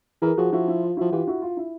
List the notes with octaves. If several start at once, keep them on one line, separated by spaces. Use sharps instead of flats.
E3 G#4 A#4
F3 F#4 G#4
F3 E4 F#4
E4
F4
F3 E4 F#4
E3 F4 G4
E4 F#4
F4
E4